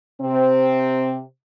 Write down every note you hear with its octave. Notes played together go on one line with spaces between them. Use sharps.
C3 C4